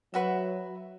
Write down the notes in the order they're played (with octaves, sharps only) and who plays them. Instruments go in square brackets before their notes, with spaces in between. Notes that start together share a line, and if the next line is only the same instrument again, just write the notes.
[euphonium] F#3 [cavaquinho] F#4 B4 E5